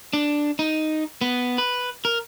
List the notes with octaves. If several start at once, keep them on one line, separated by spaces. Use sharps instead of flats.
D4
D#4
B3
B4
A#4